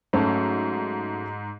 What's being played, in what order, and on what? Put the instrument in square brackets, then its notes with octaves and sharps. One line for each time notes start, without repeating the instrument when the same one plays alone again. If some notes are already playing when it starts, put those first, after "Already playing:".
[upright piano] G#2 [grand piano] F#3 A3 C#4 F#4 A4